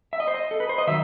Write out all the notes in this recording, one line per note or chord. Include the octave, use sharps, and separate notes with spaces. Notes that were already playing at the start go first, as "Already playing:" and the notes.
E5
D#5
C5
D#5
A4
B4
C5
D#5
D#3 F#3 E5